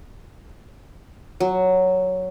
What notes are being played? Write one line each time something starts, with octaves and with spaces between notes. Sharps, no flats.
F#3